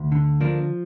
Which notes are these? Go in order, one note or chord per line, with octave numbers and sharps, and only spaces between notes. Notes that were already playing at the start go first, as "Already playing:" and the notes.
Already playing: D2
D3
F3 A#3 D4